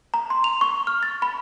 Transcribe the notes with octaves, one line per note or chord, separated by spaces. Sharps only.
A#5
C6
F7
C#6
F6
A6
B5